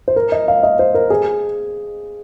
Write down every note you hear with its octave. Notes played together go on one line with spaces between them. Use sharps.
C5
A#4
D#5
F5
D#5
C5
A#4
G#4